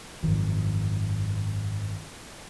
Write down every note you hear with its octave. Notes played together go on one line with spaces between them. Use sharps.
G#1 F#2 D#3 F3